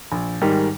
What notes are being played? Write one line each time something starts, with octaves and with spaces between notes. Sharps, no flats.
A#1
G#2 D#3 G3